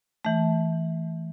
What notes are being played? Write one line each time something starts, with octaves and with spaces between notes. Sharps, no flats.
E3 A3